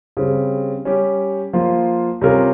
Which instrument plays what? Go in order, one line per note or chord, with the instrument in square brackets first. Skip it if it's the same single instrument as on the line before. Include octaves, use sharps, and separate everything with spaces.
[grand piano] C#3 G3 C4
G3 C#4 G4 C#5
F3 A#3 F4
C3 G3 C#4 F4 A#4